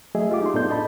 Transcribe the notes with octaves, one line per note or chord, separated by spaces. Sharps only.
F#3 A3 G#4 D#5 E5
F4 G4 D6
D#4 C6
A2 B3 D4 A4 D5 G6
D#5 A5 B5